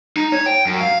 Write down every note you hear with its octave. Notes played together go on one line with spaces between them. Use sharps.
D#4
C#5
G5
F#2
F5